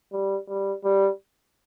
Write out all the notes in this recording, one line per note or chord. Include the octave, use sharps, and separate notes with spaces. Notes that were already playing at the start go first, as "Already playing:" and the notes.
G3
G3
G3